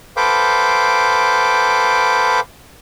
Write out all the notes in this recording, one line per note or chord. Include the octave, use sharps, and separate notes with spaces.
A4 B4 C5 F5 G5 D6